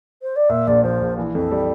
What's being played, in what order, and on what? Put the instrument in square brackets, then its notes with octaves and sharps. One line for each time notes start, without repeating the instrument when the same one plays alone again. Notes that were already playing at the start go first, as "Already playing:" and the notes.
[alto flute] C5
D5
[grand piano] A#2 [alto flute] E5
[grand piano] A#1 [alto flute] D5
[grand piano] F3 [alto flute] C5
[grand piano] A#1
E3
[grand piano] F2 [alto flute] A4
[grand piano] G3